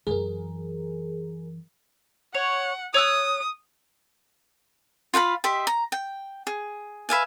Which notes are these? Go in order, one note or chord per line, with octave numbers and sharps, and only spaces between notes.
F#2 E3 G#4 A#4
C#5 F#5
C#5 D#6 E6 F#6
F4 F5 F#5 B5
G4 D#5 E5 C6
A#5
G5
G#4
B4 E5 F5 G#5